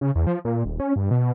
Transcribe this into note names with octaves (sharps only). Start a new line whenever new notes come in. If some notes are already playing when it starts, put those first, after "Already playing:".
C#3
E2
F3
A#2
D#1
C#4
G2
B2